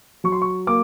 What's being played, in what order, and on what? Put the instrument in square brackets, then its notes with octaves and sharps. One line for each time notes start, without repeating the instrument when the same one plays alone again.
[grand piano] F#3 C#6
C6
C#6
A#3 D6